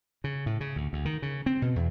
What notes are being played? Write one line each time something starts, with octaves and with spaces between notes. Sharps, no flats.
C#3
A2
C#3
D2
D2
D#3
C#3
C4
B2
E2